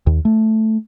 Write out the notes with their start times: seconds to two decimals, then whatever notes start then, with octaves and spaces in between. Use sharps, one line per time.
0.07 D#2
0.25 A3